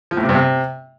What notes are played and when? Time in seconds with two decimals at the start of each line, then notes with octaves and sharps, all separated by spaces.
0.11 F3
0.17 A2
0.23 C3
0.29 G2
0.35 C3